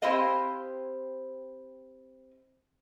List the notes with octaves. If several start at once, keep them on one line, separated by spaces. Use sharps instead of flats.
C4 E4 G4 C5 D#5 F5